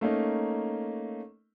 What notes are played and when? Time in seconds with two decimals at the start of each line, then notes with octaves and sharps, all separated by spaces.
0.01 A3 A#3 C#4 D#4